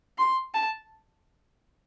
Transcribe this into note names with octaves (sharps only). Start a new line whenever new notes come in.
C6
A5